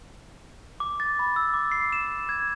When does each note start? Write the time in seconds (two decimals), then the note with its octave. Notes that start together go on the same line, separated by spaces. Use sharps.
0.80 D6
1.00 A6
1.19 B5
1.36 E6
1.54 D6
1.71 C7
1.93 E7
2.29 G#6